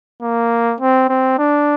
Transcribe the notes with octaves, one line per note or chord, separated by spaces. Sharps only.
A#3
C4
C4
D4